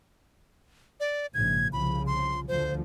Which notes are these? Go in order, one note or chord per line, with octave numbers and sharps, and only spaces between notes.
D5
A#1 G#2 C#3 G#6
C2 C#3 F3 B5
C6
D2 D3 F3 C5